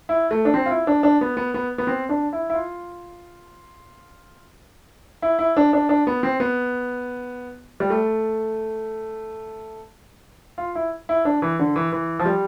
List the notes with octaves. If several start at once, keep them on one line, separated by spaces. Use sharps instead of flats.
E4
A3
D4
C4
F4
E4
D4
D4
B3
B3
B3
B3
C4
D4
E4
E4
F4
E4
E4
D4
D4
D4
B3
C4
B3
G3
A3
F4
E4
E4
D4
E3
D3
E3
E3
F3
G3